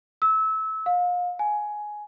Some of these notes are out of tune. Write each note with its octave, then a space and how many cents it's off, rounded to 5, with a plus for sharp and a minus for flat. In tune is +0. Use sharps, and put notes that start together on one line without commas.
E6 -25
F5 +35
G#5 +10